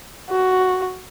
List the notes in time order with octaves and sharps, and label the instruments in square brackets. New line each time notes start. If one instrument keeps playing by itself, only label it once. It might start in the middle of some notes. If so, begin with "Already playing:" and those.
[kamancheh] F#4